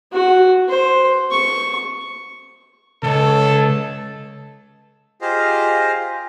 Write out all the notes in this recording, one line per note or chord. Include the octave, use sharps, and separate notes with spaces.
F#4
C5
C#6
C#2 A4
F4 G4 G#4 C5 D#5 F5